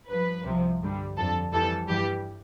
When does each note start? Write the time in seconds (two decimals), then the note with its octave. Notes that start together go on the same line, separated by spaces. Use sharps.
0.09 G2 F3 B4
0.46 C2 C3 F3
0.81 G2 D3 G3
1.17 F2 D3 F3 A4
1.52 F2 E3 G3 A4
1.88 G2 E3 G3 G4